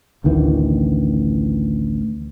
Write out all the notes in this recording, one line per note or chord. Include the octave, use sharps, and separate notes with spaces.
A1 D2 D#3 E3